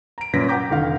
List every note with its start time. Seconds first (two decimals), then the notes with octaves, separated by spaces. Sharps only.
0.18 A#5 D7
0.33 F#2 A#2 C#4 B4 A#6 B6
0.49 F#5 G5 A#5 D6 G6
0.70 F1 D3 D#3 F5